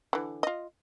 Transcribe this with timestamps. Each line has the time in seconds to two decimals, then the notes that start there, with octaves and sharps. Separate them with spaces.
0.13 D3 E3
0.43 F4 D#5